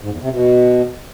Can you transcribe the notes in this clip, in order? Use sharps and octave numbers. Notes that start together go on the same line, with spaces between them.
G#2
E2
C3
B2